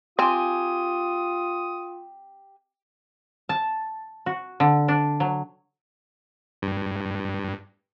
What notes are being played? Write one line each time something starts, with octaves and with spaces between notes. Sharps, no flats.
C4 F4 G4 G#5 D#6
A5
F#4
D3
D4
F#3
G2